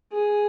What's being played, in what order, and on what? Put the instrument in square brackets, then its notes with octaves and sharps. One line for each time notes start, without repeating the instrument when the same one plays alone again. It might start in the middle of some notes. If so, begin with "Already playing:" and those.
[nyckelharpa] G#4